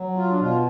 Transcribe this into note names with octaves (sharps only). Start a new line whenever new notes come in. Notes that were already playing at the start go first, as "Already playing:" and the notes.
Already playing: F#3
F4
D4
B2 F4